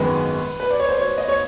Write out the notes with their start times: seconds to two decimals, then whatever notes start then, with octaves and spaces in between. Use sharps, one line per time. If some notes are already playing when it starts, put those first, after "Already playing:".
Already playing: G#1 F#2 D#3 G#3 B3 B4
0.60 B4
0.70 D5
0.79 C#5
0.89 C5
0.98 C#5
1.18 D#5
1.28 C#5